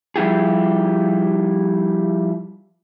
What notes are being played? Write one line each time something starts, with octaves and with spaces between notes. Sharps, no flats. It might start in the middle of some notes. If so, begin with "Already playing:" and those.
F3 G3 E4 G4 G#4